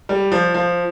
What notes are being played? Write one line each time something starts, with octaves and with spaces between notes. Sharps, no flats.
G3
F3
F3